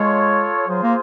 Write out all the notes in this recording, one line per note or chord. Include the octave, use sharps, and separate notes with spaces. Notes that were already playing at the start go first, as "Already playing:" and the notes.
Already playing: G#3 F4 A4 C#5
F#3 F4 G#4 C5
A#3